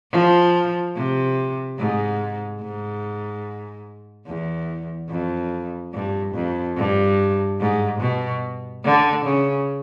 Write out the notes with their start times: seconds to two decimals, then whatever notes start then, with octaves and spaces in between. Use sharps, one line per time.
0.12 F3
0.96 C3
1.78 G#2
2.61 G#2
4.27 E2
5.10 F2
5.93 G2
6.34 F2
6.77 G2
7.60 G#2
8.01 B2
8.84 D3
9.25 C#3